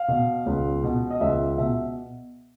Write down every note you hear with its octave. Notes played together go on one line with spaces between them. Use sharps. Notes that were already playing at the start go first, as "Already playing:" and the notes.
Already playing: F5
B2
C#2
B2
D#5
C#2 E5
B2 E5